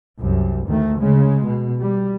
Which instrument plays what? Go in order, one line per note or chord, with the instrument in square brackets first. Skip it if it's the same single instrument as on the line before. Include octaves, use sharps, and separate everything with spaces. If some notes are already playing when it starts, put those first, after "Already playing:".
[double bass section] C2 F#2
D2 D#3 A3
C#3 G#3
B2
G3